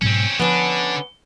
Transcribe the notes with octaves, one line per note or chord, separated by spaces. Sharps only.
G#2 B2 F#3 C4 C#4
D3 F3 B3 C#4 D4